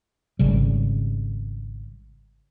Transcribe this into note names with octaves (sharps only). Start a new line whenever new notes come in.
G#1 C#3 G3